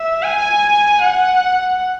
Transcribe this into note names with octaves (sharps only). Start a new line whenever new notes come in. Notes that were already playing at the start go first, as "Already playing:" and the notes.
Already playing: E5
G#5
F#5